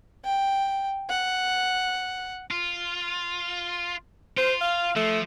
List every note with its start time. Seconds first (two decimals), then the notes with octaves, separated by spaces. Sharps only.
0.25 G5
1.10 F#5
2.51 F4
4.38 F4 C5
4.61 F5
4.96 F3 A3